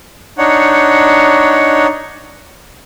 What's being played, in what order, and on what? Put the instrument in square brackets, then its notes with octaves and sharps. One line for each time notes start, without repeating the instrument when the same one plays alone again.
[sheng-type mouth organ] D4 D#4 C#5 F#5